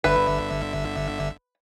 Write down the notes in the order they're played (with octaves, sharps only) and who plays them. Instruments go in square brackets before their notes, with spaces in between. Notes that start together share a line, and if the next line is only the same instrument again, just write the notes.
[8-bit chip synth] G1 D3 E5 [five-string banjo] B4